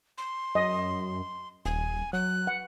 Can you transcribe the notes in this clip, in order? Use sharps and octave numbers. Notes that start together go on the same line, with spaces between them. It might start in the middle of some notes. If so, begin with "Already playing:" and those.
C6
F#2 D#5
D#1 G#5
F#3 F#6
F#5